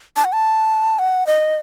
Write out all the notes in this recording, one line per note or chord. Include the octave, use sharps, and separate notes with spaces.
A5
F#5
A5
F#5
D#5